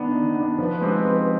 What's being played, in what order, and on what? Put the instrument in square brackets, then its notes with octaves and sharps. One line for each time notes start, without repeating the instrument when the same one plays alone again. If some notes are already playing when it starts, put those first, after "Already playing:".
Already playing: [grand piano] D#3 B3 D4
D#3
B3
D4
[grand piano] F3 [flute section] B4
[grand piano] G#3 C4 D#4 G4
F3